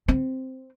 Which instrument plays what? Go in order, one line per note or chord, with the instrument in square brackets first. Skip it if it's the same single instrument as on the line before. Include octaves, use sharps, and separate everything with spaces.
[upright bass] C4